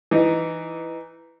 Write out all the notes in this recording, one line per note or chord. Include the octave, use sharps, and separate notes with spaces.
E3 D#4